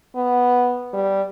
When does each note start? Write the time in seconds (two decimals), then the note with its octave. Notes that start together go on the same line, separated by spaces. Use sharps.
0.16 B3
0.93 G3